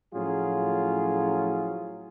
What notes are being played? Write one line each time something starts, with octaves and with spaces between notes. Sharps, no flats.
A2 F3 F#3 C#4 F4 G#4